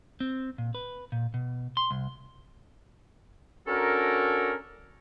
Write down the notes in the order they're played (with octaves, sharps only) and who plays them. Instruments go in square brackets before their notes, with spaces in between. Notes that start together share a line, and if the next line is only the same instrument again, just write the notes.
[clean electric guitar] C4
A#2
B4
A#2
B2
C6
C2
[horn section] C#4 D4 F#4 A4 A#4